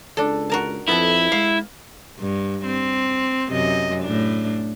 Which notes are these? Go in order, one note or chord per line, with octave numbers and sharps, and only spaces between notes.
C#2 D4 A4
F#4 A#4 A5
F2 B3 E4 A4
G#3 F5
G2
C4
F#2 C3 D#5
A2 D4